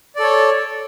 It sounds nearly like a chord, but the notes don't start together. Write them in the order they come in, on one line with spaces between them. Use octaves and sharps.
D5 A4 C#5